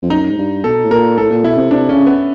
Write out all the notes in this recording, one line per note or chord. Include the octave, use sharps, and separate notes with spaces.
F2
F#2 D#4
G#2
G2
B2 A4
A2
A#2 A#4
A2 A4
A#2
B2 E4
C3
C3 D4
C#3 C#4
B3